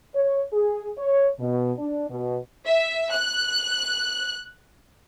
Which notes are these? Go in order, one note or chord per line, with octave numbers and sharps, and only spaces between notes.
C#5
G#4
C#5
B2
D4
B2
E5
F#6